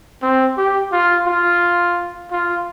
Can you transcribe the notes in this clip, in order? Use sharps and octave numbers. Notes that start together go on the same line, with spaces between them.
C4
G4
F4
F4
F4